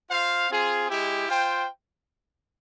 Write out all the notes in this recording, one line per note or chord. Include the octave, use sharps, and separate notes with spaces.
F4 C5 F5
C4 F4 G#4
G#3 E4 G4
F4 C5 G5